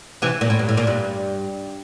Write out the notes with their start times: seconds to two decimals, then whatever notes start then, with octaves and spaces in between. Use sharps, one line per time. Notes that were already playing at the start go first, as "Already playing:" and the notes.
0.22 C3 E3
0.41 A#2
0.50 A2
0.59 G2
0.69 A2
0.77 A#2
0.87 G2